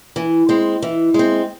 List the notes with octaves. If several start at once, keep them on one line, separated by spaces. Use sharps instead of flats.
E3
G#3 C4
E3
G#3 C4